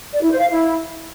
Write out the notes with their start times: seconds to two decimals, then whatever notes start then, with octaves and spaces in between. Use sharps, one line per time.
0.13 D5
0.22 E4
0.32 C5
0.41 F5
0.50 E4